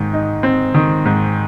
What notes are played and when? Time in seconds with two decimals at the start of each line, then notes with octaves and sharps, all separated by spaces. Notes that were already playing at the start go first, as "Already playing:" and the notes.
Already playing: G#2 D#3
0.13 D#4
0.43 C4
0.74 D#3
1.05 G#2